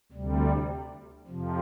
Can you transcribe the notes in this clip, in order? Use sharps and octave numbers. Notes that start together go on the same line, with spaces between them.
D2 C3 G3
F2 C3 F3